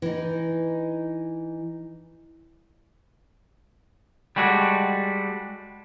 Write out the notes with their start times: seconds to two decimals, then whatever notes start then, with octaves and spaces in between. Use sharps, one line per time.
0.02 E3 D#4
4.36 G3 G#3 F#4 A4